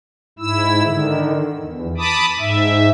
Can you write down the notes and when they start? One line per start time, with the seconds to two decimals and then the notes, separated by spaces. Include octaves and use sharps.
0.39 G#2 E4 E6
0.84 D3 D#3
1.59 E2
1.97 A5 B5 D6 D#6
2.39 G#2 E5